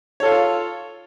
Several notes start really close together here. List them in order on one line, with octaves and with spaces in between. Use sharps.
C#5 A4 F4